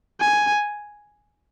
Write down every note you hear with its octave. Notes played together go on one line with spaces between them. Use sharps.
G#5